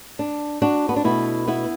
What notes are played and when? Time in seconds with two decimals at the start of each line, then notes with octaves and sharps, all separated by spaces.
0.19 D4
0.62 D4 F#4
0.89 B3
0.96 D4
1.04 B2 A3 B3 E4
1.48 B3 E4